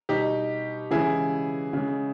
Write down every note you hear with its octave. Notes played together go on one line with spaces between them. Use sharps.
B2 G3 D#4 G4
C#3 E3 G#3 E4 G#4
C#3 G#3